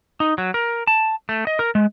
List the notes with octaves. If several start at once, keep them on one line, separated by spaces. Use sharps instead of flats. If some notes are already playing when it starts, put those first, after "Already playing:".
D#4
F#3
A#4
A5
A3
D#5
A#4
G#3